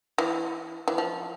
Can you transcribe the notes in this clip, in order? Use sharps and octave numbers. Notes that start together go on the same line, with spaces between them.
E3
E3
F3